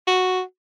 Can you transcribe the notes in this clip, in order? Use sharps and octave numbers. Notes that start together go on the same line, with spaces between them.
F#4